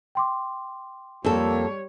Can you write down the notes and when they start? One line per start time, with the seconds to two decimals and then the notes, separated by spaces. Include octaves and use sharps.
0.15 G5 C6 D6
1.25 F2 G3 A#3 A4 C#5